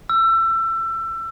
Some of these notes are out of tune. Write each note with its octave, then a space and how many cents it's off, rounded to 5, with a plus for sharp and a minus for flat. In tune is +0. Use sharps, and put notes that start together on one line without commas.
E6 +25